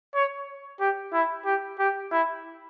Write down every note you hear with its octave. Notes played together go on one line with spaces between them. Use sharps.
C#5
G4
E4
G4
G4
E4